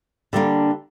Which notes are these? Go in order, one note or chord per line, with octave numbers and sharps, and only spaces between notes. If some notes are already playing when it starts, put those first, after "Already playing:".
D3 G3 A#3 D4